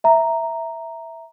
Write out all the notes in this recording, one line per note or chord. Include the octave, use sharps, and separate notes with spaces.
E5 A#5